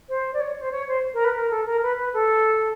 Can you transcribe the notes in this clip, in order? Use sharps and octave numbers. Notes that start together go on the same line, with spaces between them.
C5
D5
C#5
C5
C#5
C5
A#4
B4
A#4
A4
A#4
B4
B4
A4